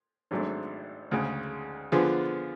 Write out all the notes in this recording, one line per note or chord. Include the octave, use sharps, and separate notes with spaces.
G#1 G#2 F#3 A3 D4
D2 C#3 G#3
D3 F3 B3 F4 G#4